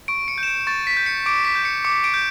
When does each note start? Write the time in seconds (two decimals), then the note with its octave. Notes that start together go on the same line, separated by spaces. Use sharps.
0.08 C#6 D7
0.28 C#7
0.38 G6
0.43 E7
0.47 D7
0.67 C#6 A6
0.87 B6
0.97 G6
1.06 C#7
1.26 D6 D7
1.45 B6
1.55 G6
1.65 C#7
1.84 D6 C#7
2.04 D7
2.14 G6